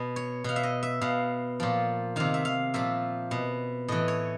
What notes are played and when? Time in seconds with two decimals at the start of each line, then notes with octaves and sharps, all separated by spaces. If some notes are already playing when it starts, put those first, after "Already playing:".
Already playing: B2
0.16 C#5
0.44 B2 F5
0.56 E5
0.63 D#5
0.83 E5
1.01 B2 F5
1.60 A#2 F3
2.16 C3 D#3 F5
2.34 E5
2.45 F5
2.74 A#2 F3 E5
3.31 B2
3.88 A2 E3 D#5
4.08 C#5